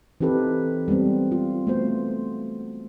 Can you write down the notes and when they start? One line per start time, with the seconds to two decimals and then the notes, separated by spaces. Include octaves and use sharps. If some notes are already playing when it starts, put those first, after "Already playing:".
0.21 E3 C4 D#4 G4 A4 B4
0.88 G3 G#3 B3 C4
1.32 F4
1.67 A3 B3 F#4 C5